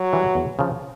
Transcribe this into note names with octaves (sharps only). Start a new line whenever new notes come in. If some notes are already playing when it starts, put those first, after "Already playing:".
Already playing: F#3
E3 G3
E2
C#3 F3